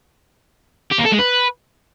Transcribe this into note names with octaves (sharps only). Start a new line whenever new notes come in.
G4
A#3
A4
G#3
B4